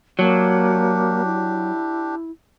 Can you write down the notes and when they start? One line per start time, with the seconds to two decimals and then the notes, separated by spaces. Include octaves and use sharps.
0.19 F#3 A#3 D4 G4
1.26 E4